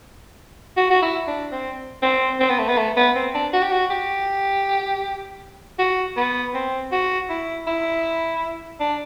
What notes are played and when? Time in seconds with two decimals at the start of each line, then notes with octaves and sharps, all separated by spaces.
0.77 F#4
0.90 F#4
1.02 E4
1.27 D4
1.52 C4
2.02 C4
2.39 C4
2.49 B3
2.58 A3
2.68 B3
2.77 A3
2.97 B3
3.15 C4
3.34 D4
3.53 F#4
3.62 G4
3.71 F#4
3.90 G4
5.79 F#4
6.17 B3
6.54 C4
6.92 F#4
7.29 E4
7.67 E4
8.80 D4